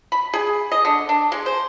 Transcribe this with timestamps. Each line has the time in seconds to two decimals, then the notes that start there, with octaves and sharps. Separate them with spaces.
0.12 B5
0.34 G#4
0.72 D#5
0.85 D3
1.09 D4
1.32 G#3
1.46 C5